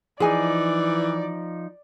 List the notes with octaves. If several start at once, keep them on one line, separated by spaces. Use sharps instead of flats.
E3 F3 D#4 G#4 D5 G#5